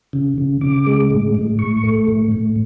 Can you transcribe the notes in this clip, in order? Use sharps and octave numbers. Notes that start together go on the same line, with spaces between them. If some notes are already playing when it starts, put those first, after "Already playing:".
C#3
C#3
C#3 D6
G#3
A2
A2
A2 C#6
A3
A2
A2